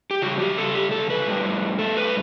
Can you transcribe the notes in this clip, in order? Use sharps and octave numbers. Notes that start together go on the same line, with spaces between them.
G4
C#3 G3 F#4
G4
A4
G4
A4
B4
A2 G3
A4
B4